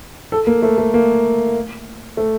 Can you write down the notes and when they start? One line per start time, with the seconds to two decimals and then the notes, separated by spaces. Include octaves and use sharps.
0.32 A4
0.47 A#3
0.63 A3
0.78 A3
0.94 A#3
2.17 A3